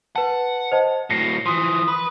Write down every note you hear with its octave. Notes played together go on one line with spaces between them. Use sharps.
B4 F#5 A5
C5 D#5 A5
A2 F#3 A#6 C7 C#7
E3 F3 C6 D#6
B4